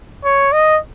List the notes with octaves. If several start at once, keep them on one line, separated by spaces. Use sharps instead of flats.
C#5
D#5